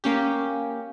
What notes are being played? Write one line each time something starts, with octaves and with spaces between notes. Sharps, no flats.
A#3 C#4 G4